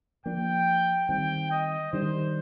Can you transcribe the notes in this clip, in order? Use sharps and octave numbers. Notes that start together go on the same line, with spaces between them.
F3 A#3 D4 G5
D#3 G3 C4 G5
D#5
D#3 G3 D4 C5